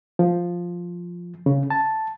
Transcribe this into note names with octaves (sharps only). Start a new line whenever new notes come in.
F3
C#3
A5